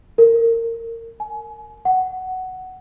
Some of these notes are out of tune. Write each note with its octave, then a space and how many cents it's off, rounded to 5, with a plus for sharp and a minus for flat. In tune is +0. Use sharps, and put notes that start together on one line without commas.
A#4 -25
G#5 +35
F#5 +10